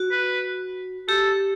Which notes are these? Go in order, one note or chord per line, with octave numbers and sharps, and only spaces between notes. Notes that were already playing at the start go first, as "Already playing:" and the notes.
Already playing: F#4
B4
G4 A4